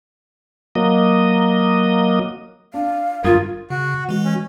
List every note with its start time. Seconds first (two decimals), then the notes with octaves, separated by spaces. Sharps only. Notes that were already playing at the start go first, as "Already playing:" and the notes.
0.75 F#3 A#3 D#5
2.74 D4 F5
3.24 G1 G2 F4 A#4 F5 D#6 G#6
3.70 C#3 F#4
4.09 E3 G#3 F#4
4.25 C#4